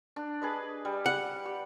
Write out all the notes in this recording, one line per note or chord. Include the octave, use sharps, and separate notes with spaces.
D4
G#4 B4 D#5
G3
F#5
G4